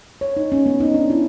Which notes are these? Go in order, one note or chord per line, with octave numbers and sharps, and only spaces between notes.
C#5
D#4
C#4
B3
D#4
D4
E4